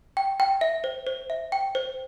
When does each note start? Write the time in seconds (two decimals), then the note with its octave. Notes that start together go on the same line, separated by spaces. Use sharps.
0.17 G5
0.40 G5
0.61 E5
0.84 C5
1.07 C5
1.30 E5
1.52 G5
1.75 C5